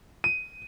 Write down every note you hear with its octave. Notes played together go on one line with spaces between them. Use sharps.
D#7